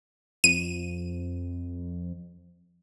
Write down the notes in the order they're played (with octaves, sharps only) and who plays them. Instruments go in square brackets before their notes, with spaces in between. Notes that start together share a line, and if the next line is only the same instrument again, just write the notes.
[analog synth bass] F2 [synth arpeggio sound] D#7